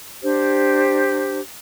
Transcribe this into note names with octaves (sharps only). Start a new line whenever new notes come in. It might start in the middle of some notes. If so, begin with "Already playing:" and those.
D4 G4 C5